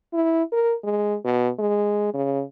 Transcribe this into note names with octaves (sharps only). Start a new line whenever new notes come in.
E4
A#4
G#3
B2
G#3
C#3